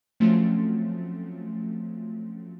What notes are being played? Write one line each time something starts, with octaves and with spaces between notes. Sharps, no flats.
F3 F#3 A3 C4 C#4